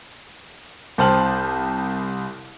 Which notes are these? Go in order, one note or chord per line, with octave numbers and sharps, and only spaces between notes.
C2 C5 G5 A5 F6 F#7